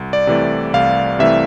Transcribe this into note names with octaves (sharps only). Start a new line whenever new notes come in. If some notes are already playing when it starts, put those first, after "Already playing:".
Already playing: C2
D5
C3 E3 A3
C2 F5
C3 E3 A3 E5